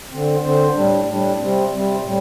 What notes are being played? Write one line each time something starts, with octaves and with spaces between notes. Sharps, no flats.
D3 C4
D3 C4 C5
A2 G3 D4
A2 G3 D4
C3 G3 C4
C3 G3 C4
A2 G3